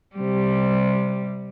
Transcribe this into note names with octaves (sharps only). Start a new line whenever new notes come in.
C3 G3